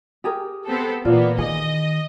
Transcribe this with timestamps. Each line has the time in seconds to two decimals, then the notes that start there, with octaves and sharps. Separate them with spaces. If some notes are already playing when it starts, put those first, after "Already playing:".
0.24 G4 G#4 A#4
0.65 B3 C4 A4
1.05 A#2 E3 A#3 B3 F4 D5
1.38 D#3 G#4 D#5